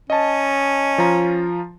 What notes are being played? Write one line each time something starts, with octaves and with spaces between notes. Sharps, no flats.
C#4 D#5 A5
F3 F4 A#5